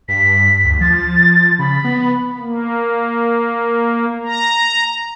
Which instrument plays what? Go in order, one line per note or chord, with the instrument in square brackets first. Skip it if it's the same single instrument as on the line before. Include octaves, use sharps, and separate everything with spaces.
[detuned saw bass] G2 [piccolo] B6
[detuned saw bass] D2
[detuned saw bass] F3 [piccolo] A6
[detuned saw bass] C#3 [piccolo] B5
[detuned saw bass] B3
[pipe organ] A#3
A#5